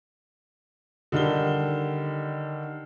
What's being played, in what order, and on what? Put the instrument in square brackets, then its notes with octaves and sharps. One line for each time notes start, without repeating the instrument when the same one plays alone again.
[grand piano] D3 D#3 G3 G7